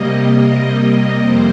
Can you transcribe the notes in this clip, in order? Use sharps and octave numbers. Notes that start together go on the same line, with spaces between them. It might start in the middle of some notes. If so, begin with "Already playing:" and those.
Already playing: C3 G3 A#3 D#5
D#5
F2 C3 G3 A#3 C5